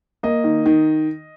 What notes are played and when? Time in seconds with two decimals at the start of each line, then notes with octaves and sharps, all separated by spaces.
0.23 A#3 D#5
0.44 D#3
0.66 D#3